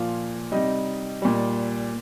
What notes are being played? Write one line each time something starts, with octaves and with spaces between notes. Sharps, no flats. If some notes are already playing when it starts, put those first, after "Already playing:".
Already playing: A#2 F3 F4 F5
C3 G3 D#4 D#5
A#2 G3